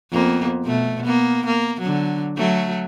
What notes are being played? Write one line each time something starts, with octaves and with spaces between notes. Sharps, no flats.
F2 A#3 B3
B2 A3
A#3 B3
A#3
D3 F#3
F#3 A3